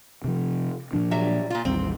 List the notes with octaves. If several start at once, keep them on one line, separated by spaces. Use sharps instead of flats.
C3 F3
A#2 F3 D4
F#3 G3 E5
A#2 F4
A1 D#2 G3 C4